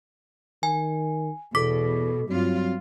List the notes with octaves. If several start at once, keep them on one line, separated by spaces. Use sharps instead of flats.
D#3 G#5
E2 B2 A4 D6 B6
G2 F#3 C4 F4